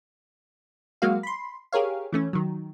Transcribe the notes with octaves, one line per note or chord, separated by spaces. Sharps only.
F#3 G#3 A#3 F#4 F5
B5 C6
G4 G#4 A#4 C#5 F5
E3 A3 C#4
D#3 F#3